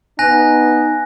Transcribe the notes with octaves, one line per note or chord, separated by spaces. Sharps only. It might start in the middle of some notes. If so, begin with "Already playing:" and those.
B3 D#4 G#5 F#6 A#6